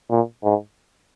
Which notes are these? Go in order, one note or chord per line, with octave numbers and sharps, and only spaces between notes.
A#2
G#2